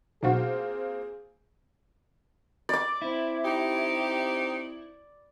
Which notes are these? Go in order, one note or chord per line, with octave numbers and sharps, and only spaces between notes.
B1 A#3 C4 F4 F#4 G#4
D5 D6
C4 E4
D#4 G4